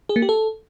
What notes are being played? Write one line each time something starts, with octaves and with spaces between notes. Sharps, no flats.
G#4
A#3
G4
A4